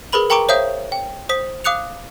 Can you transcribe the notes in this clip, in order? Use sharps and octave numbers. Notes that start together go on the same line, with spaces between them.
G#4 A#4 B4 B5 F#7
A#4 G5 A#5 C#6 D6 D7
C5 C#5 E5 F5 D#6 G6
G5
C5 D#6 B6
F5 D6 D#6 F#6 C#7 F7